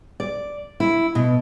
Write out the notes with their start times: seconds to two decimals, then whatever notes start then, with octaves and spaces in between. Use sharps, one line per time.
0.20 D5
0.80 E4
1.15 B2